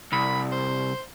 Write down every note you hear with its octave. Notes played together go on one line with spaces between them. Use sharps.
C2 B5
C5